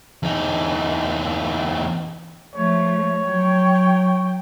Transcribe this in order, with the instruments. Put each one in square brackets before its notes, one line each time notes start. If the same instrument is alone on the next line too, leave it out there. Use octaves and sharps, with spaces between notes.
[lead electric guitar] E2 D#4
[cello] F3 A3 [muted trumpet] C#5
[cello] F#3 G5